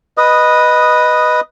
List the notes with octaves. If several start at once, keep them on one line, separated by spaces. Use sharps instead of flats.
B4 D#5 D#6